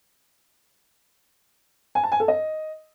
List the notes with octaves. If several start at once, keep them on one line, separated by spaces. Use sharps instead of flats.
G#5
A5
G#5
A4
D#5